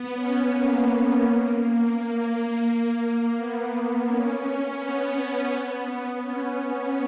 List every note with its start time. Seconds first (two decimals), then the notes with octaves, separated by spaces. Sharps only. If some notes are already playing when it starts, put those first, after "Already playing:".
Already playing: B3
0.13 C#4
0.49 A#3
1.93 A#3
3.35 B3
4.07 C#4
4.43 C#4
4.79 B3
6.22 C#4